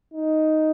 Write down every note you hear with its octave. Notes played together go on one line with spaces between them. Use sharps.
D#4